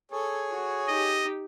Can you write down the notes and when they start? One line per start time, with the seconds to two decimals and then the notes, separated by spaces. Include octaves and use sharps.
0.12 G#4 A4 C#5
0.51 F#4
0.88 D#4 G4 D#5